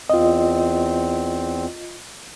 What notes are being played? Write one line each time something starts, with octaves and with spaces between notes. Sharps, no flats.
E2 C4 F4 D#5